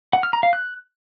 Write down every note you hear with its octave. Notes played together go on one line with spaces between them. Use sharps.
F#5
F6
A#5
F5
F#6